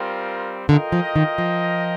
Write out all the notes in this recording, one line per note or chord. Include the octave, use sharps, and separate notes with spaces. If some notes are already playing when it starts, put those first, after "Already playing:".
Already playing: G3 C4 F4 A#4
D3 F4 A#4 D#5 G5
F3
D#3
F3